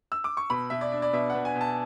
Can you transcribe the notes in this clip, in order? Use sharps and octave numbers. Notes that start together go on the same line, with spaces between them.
E6
D6
C#6
B2 B5
B2 E5
D5
D4
D5
B2 E5
F#5
B2
G#5
B2
A5